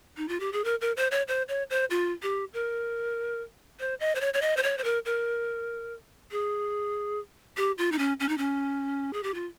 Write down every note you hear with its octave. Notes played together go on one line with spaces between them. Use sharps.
D#4
F4
G4
G#4
A#4
A#4
C5
C#5
C5
C#5
C5
F4
G4
A#4
C5
D#5
C5
C#5
C#5
D#5
C5
C#5
C5
A#4
A#4
G#4
G4
F4
D#4
C#4
C#4
D#4
C#4
G#4
G4
F4